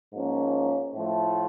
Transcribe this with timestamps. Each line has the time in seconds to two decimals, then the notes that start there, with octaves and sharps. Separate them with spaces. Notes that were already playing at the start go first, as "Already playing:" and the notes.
0.12 G#2 F3 A#3 C#4
0.94 A2 F3 A3